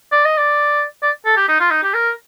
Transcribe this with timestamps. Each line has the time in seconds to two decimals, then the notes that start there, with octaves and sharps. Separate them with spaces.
0.12 D5
0.25 D#5
0.37 D5
1.02 D5
1.25 A4
1.37 G4
1.48 D#4
1.60 F4
1.71 D#4
1.83 G4
1.94 A#4